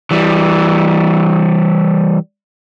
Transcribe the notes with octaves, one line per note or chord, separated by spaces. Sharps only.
E3 G3